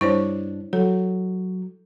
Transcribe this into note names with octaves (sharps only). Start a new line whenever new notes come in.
G2 D4 E4 C5 C#5
F#3 A4